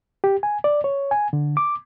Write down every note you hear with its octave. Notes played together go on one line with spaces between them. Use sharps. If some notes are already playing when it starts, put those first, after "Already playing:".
G4
G#5
D5
C#5
G#5
D3
D6